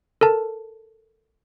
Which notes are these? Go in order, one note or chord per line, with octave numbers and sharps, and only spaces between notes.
A4 A#4 A5